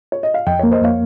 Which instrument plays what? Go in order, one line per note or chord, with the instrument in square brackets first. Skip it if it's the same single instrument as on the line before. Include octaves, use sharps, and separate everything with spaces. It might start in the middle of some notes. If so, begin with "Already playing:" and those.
[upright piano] C#5
D#5
F5
[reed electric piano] F2 [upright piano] D#5 G5
[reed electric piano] A#3 [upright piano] C#5
[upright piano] C5 D#5
[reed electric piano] F2 [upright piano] C#5 F5